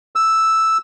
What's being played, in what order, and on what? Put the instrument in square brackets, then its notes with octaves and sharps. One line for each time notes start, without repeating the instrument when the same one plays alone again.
[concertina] E6